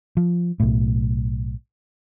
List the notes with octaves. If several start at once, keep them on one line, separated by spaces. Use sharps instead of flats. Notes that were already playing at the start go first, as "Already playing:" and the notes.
F3
B1 A2